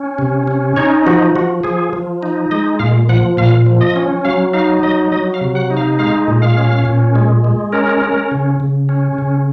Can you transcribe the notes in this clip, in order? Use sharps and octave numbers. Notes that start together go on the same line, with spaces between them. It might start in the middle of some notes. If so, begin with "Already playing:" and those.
Already playing: C#4
C3
C#4
D#4 C#5
F3 F#4
F3 F#4
F3 G#4
F3
D#4
G#3 D#5
A#2 F5
F3 F#5
A#2 F5
F3
D#5
C#4
F#3 F5
D#4 F5
F#3 D#5
F#3 D#5
F5
C3
F#5
D#4
F5
G#3 F5
A#2
F5
C#4
A#2
G#3
G#3
C#4 A#4
C#4
C#3
C#3
C#4
C#3